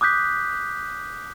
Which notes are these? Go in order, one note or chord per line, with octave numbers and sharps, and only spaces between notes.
D6 D#6 F#6 G6 B6